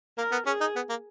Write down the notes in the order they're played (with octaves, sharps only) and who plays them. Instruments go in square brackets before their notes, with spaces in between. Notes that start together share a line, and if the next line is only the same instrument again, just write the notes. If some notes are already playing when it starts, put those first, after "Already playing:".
[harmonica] A#3 [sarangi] A#4
[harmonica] B3
[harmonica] C#4 [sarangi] G#4
[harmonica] D#4
B3
A#3